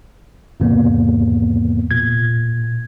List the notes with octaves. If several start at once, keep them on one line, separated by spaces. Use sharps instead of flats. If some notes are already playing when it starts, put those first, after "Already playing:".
E2 G#2 C3 E3 A#3 B3
A#2 G#6